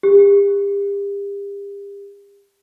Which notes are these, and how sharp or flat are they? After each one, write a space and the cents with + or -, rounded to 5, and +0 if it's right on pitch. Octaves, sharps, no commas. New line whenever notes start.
G4 +35